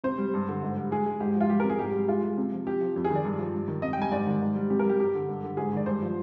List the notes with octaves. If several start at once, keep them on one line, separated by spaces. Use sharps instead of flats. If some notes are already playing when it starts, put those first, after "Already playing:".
C3 C5
G3
G2
D3
G#2
G3
G#3 G#4
G#3
G#2 G4
G4
F3
F4
G3 G4
A#4
C3
G#4
G#2 G4
G3
G#3 F4
G#3
C3
F3
C3 G4
F3
F2
G#4
D#3
D5
G2
F3
G2
D#3
C3 D#5
G5
G3 G#5
G#2 D5
D#3
G#2
G3
C3 G4
A#4
G3 G4
G2 G4
D3
G2
D3
G#2 G#4
D#3 D5
G2 C5
F3